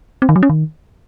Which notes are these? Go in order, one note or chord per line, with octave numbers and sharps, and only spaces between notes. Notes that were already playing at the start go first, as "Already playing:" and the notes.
C4
D#3
F#3
C#4
D#3